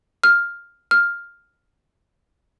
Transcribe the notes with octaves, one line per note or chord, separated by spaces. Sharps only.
F6
F6